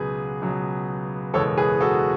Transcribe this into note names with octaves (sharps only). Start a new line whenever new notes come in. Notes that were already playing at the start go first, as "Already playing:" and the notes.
Already playing: C#2 B2 F#3 G#4 B4
C#2 B2 F#3
F#1 E2 B2 G#3 A4 C#5
G#4 B4
F#4 A4